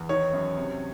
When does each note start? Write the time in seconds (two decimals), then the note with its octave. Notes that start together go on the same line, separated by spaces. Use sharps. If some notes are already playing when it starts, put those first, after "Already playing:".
Already playing: E2
0.09 D#3 C#5
0.33 F#2
0.57 C3